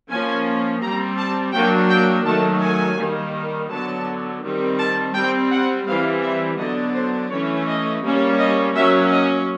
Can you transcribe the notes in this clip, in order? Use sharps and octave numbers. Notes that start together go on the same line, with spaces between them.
F3 A#3 C#4 G#5
G3 C4 A#5
A5
F#3 A#3 D4 G5
G5
D#3 F#3 A3 A5
G#5
D#3 G3 A#3
D3 F#3 B3 A5
D#3 G3 C4
A5
G3 C4 G5
F#5
E3 G3 C4 F5
E5
D3 F#3 B3 D4 D#5
C5
E3 A3 C#4 C#5
D#5
G3 A#3 C#4
D#5
F#3 A#3 C#4 E5
D#5